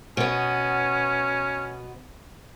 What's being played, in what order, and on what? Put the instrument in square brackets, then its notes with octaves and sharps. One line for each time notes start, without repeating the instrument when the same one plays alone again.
[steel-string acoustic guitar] B2 B3 [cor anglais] C#4